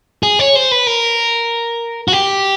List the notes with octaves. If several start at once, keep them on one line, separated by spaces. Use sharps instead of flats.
G#4
C#5
C5
B4
A#4
F#4
G4